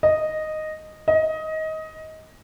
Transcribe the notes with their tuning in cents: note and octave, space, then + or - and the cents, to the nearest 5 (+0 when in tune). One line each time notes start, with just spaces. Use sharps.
D#5 -5
D#5 +20